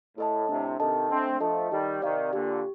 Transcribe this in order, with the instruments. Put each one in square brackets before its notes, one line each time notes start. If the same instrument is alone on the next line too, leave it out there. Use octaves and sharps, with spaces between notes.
[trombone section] A2 [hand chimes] A4 D#5 A5
[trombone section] A2 C3 [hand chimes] D4
[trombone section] C3 D#3 [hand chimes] A4 D#5 A5
[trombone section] A3 C4 [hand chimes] D4
[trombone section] F3 A3 [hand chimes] A4 D#5 A5
[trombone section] D#3 G3 [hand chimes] G4
[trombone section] C3 D#3 [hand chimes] D5 F5
[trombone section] A#2 D3 [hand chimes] G4